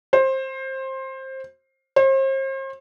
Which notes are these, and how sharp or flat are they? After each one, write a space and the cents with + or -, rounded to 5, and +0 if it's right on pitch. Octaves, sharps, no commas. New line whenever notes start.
C5 +20
C5 +40